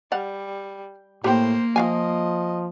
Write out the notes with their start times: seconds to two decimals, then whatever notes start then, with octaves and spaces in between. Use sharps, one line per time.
0.12 G3 D5 F5 F#5
1.24 A2 A#3 G4 C5 G5
1.76 F3 F4 D#5 F5 G#5